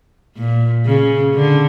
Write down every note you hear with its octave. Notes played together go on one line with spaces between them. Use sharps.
A#2
C#3
D3